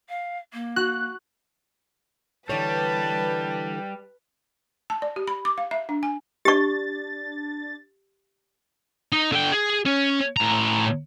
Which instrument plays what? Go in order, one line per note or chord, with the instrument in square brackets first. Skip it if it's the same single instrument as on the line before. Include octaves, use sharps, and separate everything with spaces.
[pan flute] F5
A#3
[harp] F#4 [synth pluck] F#6
[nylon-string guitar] D3 E3 C#5 [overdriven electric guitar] G3 [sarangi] B4 [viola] A5
[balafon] A5
D5
G4
B5
D6
F5
E5
D4
G#5
[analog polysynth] D4 A6 [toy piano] G4 C#6
[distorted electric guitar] D#4
D3 G5
G#4
C#4
A2 A#5